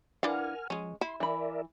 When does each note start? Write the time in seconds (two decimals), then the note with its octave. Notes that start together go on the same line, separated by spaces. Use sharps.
0.23 E3 D4 A#4 F5 F#5 G#5 F6
0.70 F3 G#3 C#4
1.01 E4 C6
1.20 E3 A#4 D5 E5 B5